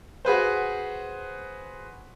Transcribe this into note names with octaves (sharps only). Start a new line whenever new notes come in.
F#4 G#4 B4 C5